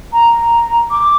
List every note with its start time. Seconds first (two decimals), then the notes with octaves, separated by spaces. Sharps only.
0.12 A#5
0.92 D6